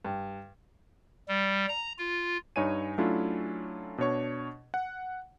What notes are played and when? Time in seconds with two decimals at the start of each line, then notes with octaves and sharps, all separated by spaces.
0.05 G2
1.28 G3
1.68 A#5
1.98 F4
2.56 G2 D#4 C#5 G#5 D#7
2.98 F#3 A3 C#4 D4 E4 F4
3.98 B2 D4 C#5 C#6
4.74 F#5